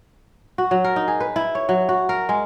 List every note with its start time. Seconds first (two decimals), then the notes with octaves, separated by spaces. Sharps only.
0.58 F#4
0.71 F#3
0.84 A#4
0.96 D#4
1.08 G#4
1.20 B4
1.36 E4
1.55 C#5
1.69 F#3
1.89 F#4
2.09 A#4
2.29 G#3